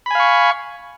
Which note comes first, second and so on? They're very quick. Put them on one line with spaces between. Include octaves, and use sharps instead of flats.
B5 G#5 F5 C#6